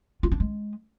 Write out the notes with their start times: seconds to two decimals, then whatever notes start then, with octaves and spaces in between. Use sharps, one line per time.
0.23 F4
0.32 D4
0.40 G#3